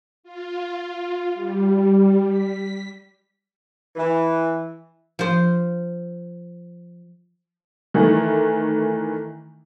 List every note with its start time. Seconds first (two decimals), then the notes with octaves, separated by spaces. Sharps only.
0.23 F4
1.34 G3
2.29 B6
3.96 E3
5.19 F3 C5
7.94 D#3 E3 A3